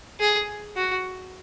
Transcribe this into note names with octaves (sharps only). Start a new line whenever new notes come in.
G#4
F#4